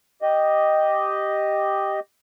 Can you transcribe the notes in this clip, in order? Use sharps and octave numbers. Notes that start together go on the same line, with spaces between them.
G4 D#5